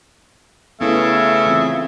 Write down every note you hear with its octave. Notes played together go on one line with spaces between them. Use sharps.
C#3 A3 B3 E4 E5
E3 C4 F4